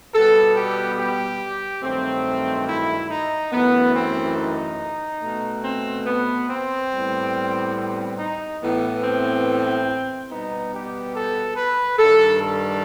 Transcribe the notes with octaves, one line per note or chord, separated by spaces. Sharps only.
B2 G3 B3 A4
G4
G4
G2 D#3 F#3 A3 C4
E4
D#4
F#2 E3 A3 B3
C4
D#4
B2 A3
C4
B3
C4
A2 G3 B3
C4
D#4
A2 E3 B3
C4
B2 G3 B3 D#4
G4
A4
B4
G2 D#3 G3 A4
A4